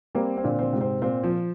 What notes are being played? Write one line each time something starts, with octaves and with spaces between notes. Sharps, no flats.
G3 A#3 C4
C4
A#2 D3
D3 C4
G#2 C3
C4
A#2 C4
F3